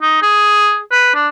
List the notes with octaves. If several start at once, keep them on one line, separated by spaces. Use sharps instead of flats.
D#4
G#4
B4
D4